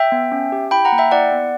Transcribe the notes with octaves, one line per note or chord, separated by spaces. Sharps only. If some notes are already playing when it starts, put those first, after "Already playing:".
Already playing: E5 G5
B3
C#4
G4
E4 G5 B5
F#5 A#5
A#3
E5 G5
E4 D5 F#5
B3